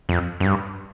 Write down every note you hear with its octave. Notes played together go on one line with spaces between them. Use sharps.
F2
F#2
G2